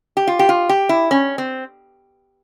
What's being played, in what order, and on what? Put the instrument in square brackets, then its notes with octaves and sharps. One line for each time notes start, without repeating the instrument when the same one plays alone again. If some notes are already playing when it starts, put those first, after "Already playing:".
[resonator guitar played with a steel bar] G4
F4
G4
F4
G4
E4
C#4
C4